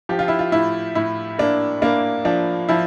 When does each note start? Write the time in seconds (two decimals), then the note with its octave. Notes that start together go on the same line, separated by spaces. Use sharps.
0.09 F3 G4
0.19 F4
0.28 E4
0.39 F4
0.52 A2 E4
0.95 A2 E4
1.39 A#3 D4
1.82 A#3 D4
2.25 F3 D4
2.69 F3 E4